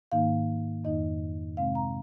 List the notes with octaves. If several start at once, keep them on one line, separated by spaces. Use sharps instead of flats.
G#2 D#3 A#3 D#4 F5
F2 D#3 A#3 D#4 D#5
C3 G#3 C4 F5
A#5